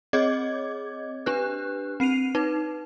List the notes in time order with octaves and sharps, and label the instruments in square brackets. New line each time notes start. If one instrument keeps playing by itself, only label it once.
[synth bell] C4 G#4 C#5 D#5 D6 G#6
D4 G4 B4 F#6
C4 C7 D#7 F7
D#4 B4